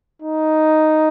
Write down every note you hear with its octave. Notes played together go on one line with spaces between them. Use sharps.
D#4